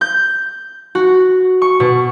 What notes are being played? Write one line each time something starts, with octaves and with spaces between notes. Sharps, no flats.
G6
F#4
C#6
B2